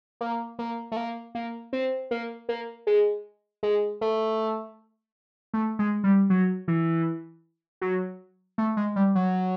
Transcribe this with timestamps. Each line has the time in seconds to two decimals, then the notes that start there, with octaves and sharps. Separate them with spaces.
0.21 A#3
0.59 A#3
0.92 A3
0.97 A#3
1.35 A#3
1.73 C4
2.11 A#3
2.49 A#3
2.87 G#3
3.63 G#3
4.01 A3
5.53 A3
5.79 G#3
6.04 G3
6.30 F#3
6.68 E3
7.81 F#3
8.58 A3
8.77 G#3
8.96 G3
9.15 F#3